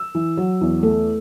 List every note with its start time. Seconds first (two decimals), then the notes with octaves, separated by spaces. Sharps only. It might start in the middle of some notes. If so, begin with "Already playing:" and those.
Already playing: E6
0.15 E3
0.37 F#3
0.61 E2
0.83 A3